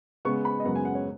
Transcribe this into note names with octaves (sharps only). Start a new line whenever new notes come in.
C#3 G#3 B3 C#6
B5
D#5
F#2 C#3 G#3 B3 F#5
G#5
F#5
C#5